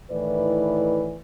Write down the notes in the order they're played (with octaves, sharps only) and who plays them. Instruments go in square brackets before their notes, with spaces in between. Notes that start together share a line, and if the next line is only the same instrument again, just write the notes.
[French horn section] A2 D#3 E3 E4 B4 D5